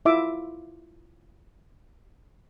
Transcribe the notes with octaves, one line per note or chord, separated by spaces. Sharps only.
E4 F4 E5 D6